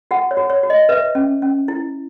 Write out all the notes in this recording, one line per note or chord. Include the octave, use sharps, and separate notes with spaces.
F#4 F#5
C#5
F#4
C#5
F#4
D#5
B4 E5
C#4
C#4
E4